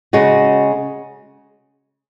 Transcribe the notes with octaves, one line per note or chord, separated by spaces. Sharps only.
C#3 G#3 C#4 F#4